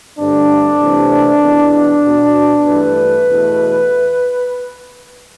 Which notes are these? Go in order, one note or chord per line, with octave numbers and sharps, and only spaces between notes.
G2 D3 A3 C4 D4
C2 C3 E3 A3 C4
E2 B2 B3
B2 B3
G2 E3 A3 B4
E2 B2 A3